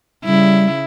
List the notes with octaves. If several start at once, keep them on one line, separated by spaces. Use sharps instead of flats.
C#3 G3 E4